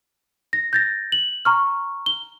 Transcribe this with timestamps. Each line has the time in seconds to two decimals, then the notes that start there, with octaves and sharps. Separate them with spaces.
0.53 A#6
0.73 G6 A6 A#6
1.12 F#7
1.45 A#5 C#6 F6
2.06 G7